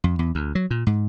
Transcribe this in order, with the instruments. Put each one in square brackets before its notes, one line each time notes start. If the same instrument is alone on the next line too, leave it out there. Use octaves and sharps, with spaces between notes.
[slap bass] F2
E2
D2
F#3
A#2
G#2